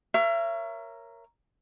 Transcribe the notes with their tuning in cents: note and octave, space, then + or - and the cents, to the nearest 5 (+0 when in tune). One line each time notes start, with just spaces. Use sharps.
A#4 +0 C#5 +0 E5 +35